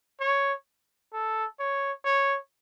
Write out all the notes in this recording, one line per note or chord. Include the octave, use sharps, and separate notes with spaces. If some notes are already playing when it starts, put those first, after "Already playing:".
C#5
A4
C#5
C#5